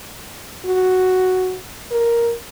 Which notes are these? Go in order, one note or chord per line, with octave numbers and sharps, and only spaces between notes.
F#4
A#4